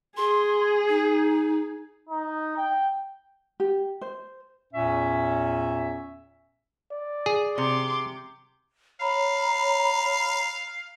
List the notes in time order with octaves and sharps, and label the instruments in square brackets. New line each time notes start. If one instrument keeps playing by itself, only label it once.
[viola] G#4 [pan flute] C6
[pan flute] D#4
[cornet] D#4
G5
[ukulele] G4
C5
[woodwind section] E2 A#2 C#4 E5
[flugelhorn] D5
[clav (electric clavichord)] G#4
[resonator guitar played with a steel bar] C3 [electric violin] C6 D6
[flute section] C#5 A#5 [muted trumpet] F5 [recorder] B5